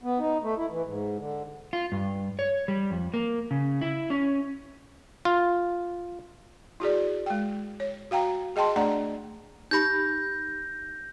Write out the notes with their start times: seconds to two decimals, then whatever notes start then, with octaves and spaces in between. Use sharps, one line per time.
0.03 B3
0.19 D#4
0.43 A3
0.58 E4
0.70 E3
0.85 G#2
1.19 D3
1.73 F4
1.92 G2
2.39 C#5
2.68 G3
2.91 F2
3.14 A#3
3.51 C#3
3.81 E4
4.10 C#4
5.25 F4
6.80 E4 F#4 G#4 D5
7.26 G#3 G5
7.80 C#5
8.11 F#4 F5 G5 A#5
8.56 G#4 D#5 G5 A5 C6
8.76 A3 D4 D5 F#5 A#5
9.71 D#4 G4 B5 G6 A#6